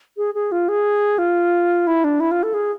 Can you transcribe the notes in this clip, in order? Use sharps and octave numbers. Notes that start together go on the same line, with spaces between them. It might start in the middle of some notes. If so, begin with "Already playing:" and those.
G#4
G#4
F4
G#4
F4
E4
D4
E4
F4
A4
G#4